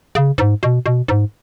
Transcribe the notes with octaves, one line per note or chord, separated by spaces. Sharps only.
C#3
G#2
B2
B2
G#2